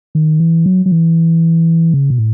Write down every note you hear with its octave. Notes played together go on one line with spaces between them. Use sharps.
D#3
E3
F#3
F#3
E3
C#3
B2
A2